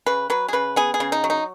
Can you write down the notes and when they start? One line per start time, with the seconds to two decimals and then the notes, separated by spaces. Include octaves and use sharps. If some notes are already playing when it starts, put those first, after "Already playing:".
0.06 C#3 B4
0.30 F#3 B4
0.48 G#4
0.53 C#3 B4
0.76 B3 G#4
0.94 G#4
1.00 C#3
1.12 D#4
1.24 F#3
1.30 D#4